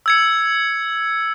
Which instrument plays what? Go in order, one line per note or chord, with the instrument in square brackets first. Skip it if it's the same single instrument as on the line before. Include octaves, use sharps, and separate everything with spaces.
[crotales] E6 G#6 C#7